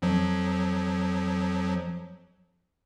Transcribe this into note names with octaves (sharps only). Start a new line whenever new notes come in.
F2 F3 F#3